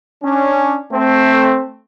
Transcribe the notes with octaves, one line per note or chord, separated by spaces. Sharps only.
C#4 D4
A3 C4